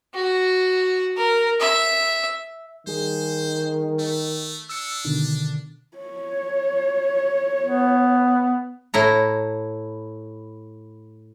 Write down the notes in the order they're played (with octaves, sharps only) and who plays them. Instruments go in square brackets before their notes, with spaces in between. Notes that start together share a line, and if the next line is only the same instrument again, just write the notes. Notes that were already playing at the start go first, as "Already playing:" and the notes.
[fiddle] F#4
A#4
E5
[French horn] D#3 [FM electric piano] G3 G#4 [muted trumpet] C5
[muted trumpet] A3
[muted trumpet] D4 [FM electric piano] E6 C#7
[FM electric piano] B2 D3 D#3
[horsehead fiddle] C#5
[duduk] B3
[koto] A2 E4 A#5